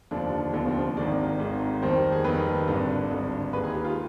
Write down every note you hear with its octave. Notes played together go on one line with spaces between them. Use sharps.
F1 D#2 D3 F3 D4
F1 D#2 D3 F3 B3
C4
G#1 G#2 D#3 G#3 D5
G#1 G#2 D#3 G#3
F2 D#3 G3 C5
G#4
F2 D#3 G3 B4
G#1 G2 D3
G#1 G2 D3
D#2 D#3 G#3 B4
G#4
G4
F4